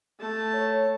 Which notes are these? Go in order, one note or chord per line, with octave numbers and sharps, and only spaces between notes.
A3 A5
C#5